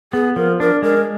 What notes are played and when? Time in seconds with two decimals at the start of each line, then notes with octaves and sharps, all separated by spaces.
0.13 B3 G#4
0.36 F3 A#4
0.60 D4 A#4
0.82 G#3 A#4